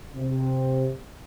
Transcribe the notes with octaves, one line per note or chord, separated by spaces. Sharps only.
C3